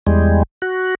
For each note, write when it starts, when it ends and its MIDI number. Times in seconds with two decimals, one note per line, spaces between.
0.07 0.43 40
0.07 0.43 55
0.07 0.43 56
0.62 0.95 66